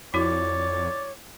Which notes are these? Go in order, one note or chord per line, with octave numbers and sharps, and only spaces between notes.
F2 E4 F#4 C#5 D5